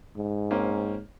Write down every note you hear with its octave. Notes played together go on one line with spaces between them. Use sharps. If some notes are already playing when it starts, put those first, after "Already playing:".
G#2
A#3 C4 C#4